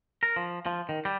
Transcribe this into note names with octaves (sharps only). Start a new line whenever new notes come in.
A#4
F3
F3
D#3
G3